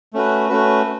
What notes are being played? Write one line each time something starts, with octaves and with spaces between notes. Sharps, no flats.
A3 C#4 F#4 B4
A3 C#4 F#4 B4